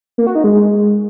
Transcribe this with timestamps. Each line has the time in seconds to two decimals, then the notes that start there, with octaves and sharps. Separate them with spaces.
0.18 A#3
0.27 F#4
0.35 D#4
0.44 G#3